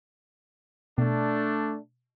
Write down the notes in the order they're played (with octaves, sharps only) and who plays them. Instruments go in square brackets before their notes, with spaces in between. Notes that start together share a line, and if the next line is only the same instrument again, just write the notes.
[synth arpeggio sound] B2 [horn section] A3 D4